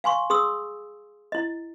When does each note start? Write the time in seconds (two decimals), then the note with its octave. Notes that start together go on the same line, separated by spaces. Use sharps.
0.04 F5 G#5 C6 C#6
0.30 G#4 C6 D#6 E6
1.32 E4 D#5